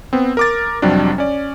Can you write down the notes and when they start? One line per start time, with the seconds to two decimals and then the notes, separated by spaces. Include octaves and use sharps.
0.13 B3 C4
0.37 A#4 D6 A6
0.82 F2 C3 F#3 G3 D4
1.18 C#4 D5